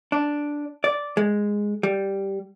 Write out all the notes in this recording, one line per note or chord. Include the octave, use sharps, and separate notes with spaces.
D4
D5
G#3
G3